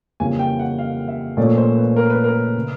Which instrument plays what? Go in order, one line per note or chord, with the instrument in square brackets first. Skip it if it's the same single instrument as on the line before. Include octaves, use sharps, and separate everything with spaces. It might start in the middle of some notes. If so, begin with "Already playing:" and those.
[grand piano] F2 C#3 E3 G3 A#3 [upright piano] G#5
[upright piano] G5
F#5
F5
E5
[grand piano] A#2 F3 A3 C#4 [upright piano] D5
[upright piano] C5
B4
A#4
B4
A#4
[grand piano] C#3